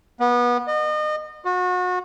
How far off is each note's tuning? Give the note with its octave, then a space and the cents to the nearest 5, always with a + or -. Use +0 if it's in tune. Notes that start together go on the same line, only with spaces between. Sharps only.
B3 -25
D#5 -35
F#4 -35